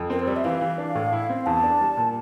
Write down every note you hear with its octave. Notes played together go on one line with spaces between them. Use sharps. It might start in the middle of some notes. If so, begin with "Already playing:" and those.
Already playing: F2
C4 A#4
C5
G3 D5
E5
E3 F5
E3
D4
A2
E4
C4
E2 A5
D4
G3
A#2